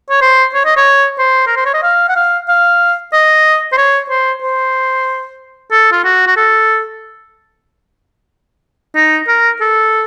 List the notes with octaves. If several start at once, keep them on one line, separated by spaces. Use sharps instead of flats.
C#5
C5
C#5
D#5
C#5
C5
A#4
C5
C#5
D#5
F5
F#5
F5
F5
D#5
C5
C#5
C5
C5
A4
F4
F#4
F#4
A4
D#4
A#4
A4